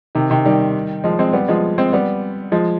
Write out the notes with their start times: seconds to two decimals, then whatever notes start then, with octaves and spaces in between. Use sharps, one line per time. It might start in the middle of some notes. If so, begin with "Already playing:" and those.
0.15 C3 D#3
0.30 C3 D#3
0.46 D#3 G3
1.04 F3 G#3
1.19 G#3 C4
1.33 G3 B3
1.48 F3 G#3
1.78 G#3 C4
1.93 G3 B3
2.52 F3 G#3